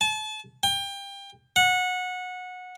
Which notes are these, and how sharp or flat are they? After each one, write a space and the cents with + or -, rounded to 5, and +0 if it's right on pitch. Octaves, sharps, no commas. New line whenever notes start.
A5 -35
G5 +25
F#5 -20